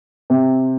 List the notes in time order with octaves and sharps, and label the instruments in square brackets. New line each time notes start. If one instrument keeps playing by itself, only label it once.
[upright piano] C3